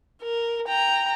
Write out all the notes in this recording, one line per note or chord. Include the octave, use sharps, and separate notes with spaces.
A#4
G5 A#5